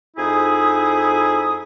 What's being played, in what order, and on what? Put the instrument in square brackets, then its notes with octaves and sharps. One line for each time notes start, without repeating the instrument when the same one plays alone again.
[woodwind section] F2 D#4 E4 G#4 D#6